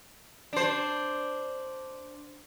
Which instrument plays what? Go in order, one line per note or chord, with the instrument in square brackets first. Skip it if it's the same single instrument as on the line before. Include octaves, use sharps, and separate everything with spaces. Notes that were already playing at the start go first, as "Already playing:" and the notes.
[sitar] D4 C5